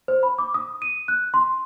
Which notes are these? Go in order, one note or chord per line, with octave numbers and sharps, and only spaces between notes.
C5
B5
D6
D#6
D#7
F#6
C6